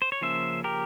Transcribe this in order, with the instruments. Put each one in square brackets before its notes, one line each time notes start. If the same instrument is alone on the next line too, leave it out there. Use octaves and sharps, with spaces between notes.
[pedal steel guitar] C5
C#5
C#3 F3 A#3 C#4 C5 E5
G4 A#4